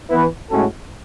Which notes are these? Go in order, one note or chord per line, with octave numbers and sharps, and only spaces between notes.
E3 B3 E4 B4
A2 G#3 C#4 F#4 A4